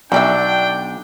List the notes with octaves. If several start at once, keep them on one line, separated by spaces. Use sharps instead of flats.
B1 D4 F#4 D5 E5 G5